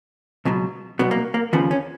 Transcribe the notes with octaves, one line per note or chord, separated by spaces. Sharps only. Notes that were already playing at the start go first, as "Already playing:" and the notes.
C#2 B2 F#3
C2 B2 F#3 B3
A#3
A#3
D#2 C#3 F3 B3
C#4